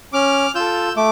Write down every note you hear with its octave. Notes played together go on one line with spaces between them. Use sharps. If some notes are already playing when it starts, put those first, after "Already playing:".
C#4 D6 F6
F4 A4 E6 G6
A3 D6